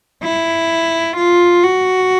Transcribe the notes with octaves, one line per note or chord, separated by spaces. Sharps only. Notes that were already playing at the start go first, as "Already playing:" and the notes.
E4
F4
F#4